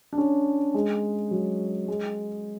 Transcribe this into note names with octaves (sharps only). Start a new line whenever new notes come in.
D4
C#4
G#3
F#3
G#3